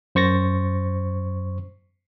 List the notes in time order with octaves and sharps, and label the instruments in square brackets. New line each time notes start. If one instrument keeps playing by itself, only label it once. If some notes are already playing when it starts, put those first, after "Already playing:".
[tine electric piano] F#2 C5 C#6 A6 A#6